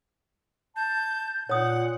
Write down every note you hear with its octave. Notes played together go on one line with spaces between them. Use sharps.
A5 G6
A#2 C#5 F#5 D#6